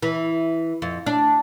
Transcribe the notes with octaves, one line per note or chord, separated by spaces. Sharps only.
E3
F2
D4